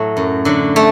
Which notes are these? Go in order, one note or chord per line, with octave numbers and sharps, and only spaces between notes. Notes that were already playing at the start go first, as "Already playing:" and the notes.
Already playing: A2 F#3 A3
F#2
D3 F#3
A3